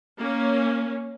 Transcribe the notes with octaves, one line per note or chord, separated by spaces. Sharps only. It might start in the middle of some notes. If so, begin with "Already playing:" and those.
A#3 C#4